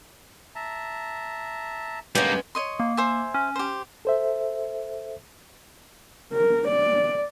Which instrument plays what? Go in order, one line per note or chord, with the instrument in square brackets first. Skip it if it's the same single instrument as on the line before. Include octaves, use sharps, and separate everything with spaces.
[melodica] E5 A5 A#5
[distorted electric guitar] G2 A#3 [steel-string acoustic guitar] G#3 B3 C#4 [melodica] G4 [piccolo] G6
[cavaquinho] C#5 D#5 C6
[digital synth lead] A#3
[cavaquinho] C5 E5 G#5
[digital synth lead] C#4
[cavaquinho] G4 C5
[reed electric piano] A4 C5 E5
[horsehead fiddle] A#4
D5